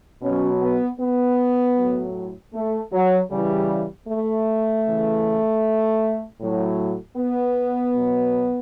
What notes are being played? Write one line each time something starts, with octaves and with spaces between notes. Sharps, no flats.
B2 F#3 C#4
B3
B3
A2 F#3
A3
F#3
C#3 E3 G3
A3
C#3 E3
A2 F#3
B3
B2 F#3